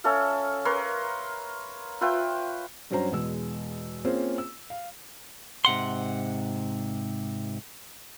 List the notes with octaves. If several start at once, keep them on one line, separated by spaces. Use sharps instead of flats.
C#4 A4 E5 F5
A#4 B4 C#5 C6
F4 B4 E5 G5
G2 F#3 C#4 C5 A#5
E2 B2 G#3 E6
A#3 C4 C#4 F4 G#4 C5
E6
F5
G#2 C3 F#5 C6